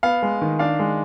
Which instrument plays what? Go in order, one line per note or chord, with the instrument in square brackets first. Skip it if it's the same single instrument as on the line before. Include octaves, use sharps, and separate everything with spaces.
[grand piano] B3 F5
G#3
D#3
D4 F5
G#3